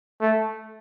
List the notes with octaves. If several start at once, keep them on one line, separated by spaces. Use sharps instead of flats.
A3